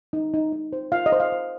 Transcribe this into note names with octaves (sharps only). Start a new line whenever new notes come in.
D#4
D#4
D#4
C5
F4 F5
D#5
C5
F5
C5